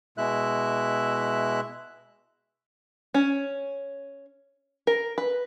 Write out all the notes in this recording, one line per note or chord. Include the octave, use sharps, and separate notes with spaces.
B2 G#3 E4 E5 F#6
C#4
A#4
B4